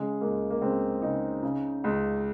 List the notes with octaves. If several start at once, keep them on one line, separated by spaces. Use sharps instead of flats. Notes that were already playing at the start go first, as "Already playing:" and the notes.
Already playing: C#3 G#3
C#2 A#3
A#3
C#2 C4
C#3 D#4
C#3
C#2